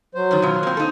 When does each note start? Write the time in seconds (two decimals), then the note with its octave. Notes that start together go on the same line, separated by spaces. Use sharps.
0.15 F#3 C5
0.31 F#2 D#3
0.42 B2 F#3 F4
0.63 A#3 C4
0.77 D#4 A4